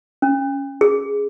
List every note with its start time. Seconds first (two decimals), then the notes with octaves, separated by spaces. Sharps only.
0.22 C#4
0.81 G#4